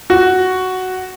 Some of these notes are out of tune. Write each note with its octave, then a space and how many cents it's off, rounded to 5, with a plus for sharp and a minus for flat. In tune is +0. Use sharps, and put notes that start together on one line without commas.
F#4 +5